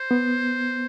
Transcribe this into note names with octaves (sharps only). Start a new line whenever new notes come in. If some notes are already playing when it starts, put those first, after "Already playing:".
Already playing: C5
B3